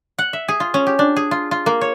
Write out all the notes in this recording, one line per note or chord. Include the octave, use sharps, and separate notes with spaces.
F#5
E5
G#4
F4
C#4
G4
D4
G#4
F4
F4
A#3
C#5